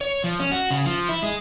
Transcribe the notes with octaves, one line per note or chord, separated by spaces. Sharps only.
C#5
F3
C#4
F#4
C#3
F3
E4
G#3